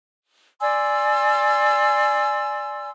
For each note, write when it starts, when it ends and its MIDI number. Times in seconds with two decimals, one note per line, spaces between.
0.61 2.91 74
0.61 2.91 80
0.61 2.91 84
0.61 2.91 88